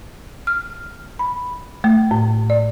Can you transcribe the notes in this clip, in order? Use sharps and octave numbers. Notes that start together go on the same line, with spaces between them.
F6
B5
A3
A2
D5